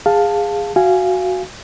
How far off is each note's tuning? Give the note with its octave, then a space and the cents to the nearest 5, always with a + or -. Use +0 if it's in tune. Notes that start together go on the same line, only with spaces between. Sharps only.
G#4 -20 F5 +10 A5 +5
F#4 +0 F5 -20 G#5 +0